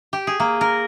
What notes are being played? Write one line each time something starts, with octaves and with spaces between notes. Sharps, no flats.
G4
G#4
A#3
A#4